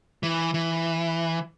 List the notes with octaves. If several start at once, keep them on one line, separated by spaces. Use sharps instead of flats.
E3
E3